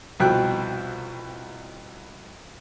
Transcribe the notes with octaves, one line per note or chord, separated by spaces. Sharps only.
C2 B2 F3 G5 F#6